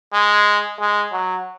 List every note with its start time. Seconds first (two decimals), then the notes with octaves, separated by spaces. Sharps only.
0.13 G#3
0.80 G#3
1.13 F#3